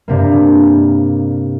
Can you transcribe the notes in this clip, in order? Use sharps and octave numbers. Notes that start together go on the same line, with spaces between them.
G2 C3 A#3